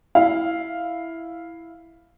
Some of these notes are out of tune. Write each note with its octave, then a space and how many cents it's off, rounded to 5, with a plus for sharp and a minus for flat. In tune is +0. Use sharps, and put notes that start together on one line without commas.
E4 +0 F5 +0